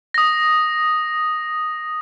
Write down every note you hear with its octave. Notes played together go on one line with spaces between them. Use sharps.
D#6 A#6